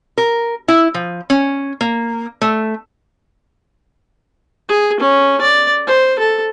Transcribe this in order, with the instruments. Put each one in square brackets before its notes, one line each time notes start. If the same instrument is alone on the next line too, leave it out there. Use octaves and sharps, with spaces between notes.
[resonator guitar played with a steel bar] A#4
E4
F3
C#4
A#3
A3
[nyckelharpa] G#4
C#4
D5
C5
A4